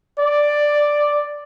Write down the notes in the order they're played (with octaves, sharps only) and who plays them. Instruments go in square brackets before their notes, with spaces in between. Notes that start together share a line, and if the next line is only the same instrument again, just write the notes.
[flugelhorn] D5